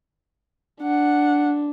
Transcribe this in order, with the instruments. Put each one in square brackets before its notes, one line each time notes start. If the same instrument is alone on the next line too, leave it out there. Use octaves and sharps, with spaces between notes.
[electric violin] D4 [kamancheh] F#5